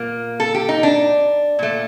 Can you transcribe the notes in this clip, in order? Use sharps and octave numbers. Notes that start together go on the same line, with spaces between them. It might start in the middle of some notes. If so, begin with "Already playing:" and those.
Already playing: A#2 A#3
A4
G4
D#4
D4
A#2 A3